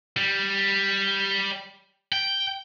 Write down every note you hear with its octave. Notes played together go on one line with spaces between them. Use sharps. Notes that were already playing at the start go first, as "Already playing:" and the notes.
G3
G5